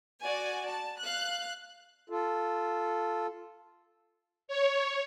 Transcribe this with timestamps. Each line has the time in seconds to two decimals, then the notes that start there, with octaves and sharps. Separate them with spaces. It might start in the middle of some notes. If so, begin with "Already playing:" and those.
0.23 F#4 D5 G#5
0.68 A5
1.00 F5 F#6
2.10 F4 A4
4.48 C#5